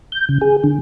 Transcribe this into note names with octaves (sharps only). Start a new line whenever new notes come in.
G6
C#3
G#4
D3